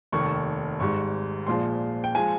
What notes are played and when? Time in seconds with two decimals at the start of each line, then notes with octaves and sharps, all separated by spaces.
0.12 F1 D#2 D#3 C#6
0.80 G#1 G#2 G3 C#6
1.47 A#1 A#2 F3 G#3 C6
2.04 G5
2.15 F3 G#3 G#5